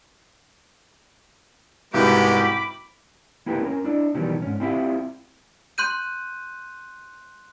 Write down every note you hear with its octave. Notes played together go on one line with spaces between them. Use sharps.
C2 G#2 G#3 B3 F#4 G4 B5 D6
A#3 E4 G4 A#4 B4
C#4 A#4
D4 E4 D5
B2 D#3 E3 F#3 G3
G#2 C#4
C4 E4 F4 G4 E5
C6 F#6 G6 D#7